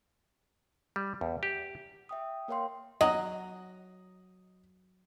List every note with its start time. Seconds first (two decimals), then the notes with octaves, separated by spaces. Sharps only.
0.96 G3
1.21 E2
1.43 G4
2.09 E5 G5 D#6
2.48 A#3 A#4 C#5 F5 G5 C6
3.01 F#3 D#5